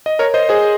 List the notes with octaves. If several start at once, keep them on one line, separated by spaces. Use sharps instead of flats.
D#5
A#4 C#5
C5 D#5
G#4 C5